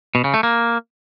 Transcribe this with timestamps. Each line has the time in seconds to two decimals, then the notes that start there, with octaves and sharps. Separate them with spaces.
0.15 B2
0.24 C#3
0.34 A3
0.43 A#3